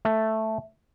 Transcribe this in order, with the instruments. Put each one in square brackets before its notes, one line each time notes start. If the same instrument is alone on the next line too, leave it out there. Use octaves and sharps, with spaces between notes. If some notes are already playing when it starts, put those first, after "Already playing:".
[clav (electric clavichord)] A3